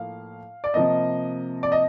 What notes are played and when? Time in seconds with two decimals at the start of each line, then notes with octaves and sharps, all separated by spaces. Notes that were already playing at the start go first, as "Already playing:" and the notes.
Already playing: A2 F3 A#3 F5
0.64 D5
0.74 C3 F3 A#3 D#5
1.63 D5
1.72 D#5